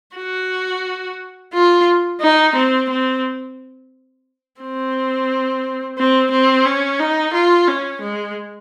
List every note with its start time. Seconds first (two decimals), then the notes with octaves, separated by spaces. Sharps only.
0.16 F#4
1.53 F4
2.21 D#4
2.55 C4
2.89 C4
4.61 C4
5.97 C4
6.31 C4
6.65 C#4
6.99 D#4
7.33 F4
7.67 C#4
8.01 G#3